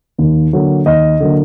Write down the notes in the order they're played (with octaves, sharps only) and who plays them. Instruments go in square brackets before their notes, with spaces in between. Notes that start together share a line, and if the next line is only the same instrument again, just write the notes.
[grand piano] D#2
D3 F#3 A#3
D#2 D#5
D3 F#3 A#3